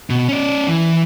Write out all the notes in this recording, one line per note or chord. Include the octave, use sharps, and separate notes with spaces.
B2
C#4 D5
E3